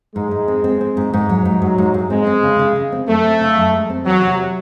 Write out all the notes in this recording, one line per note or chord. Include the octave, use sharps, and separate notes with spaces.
G#2 G#3
G#2
C4
C4
C4
G#2
G#2
F#3
G#2
G#2 F#3
G#2
G#2
G#3 C4
C4
C#3
C#3
C#3
C4
F#2 A3
C4
C#3
F#2
G#3
C4
E2 F#3
C3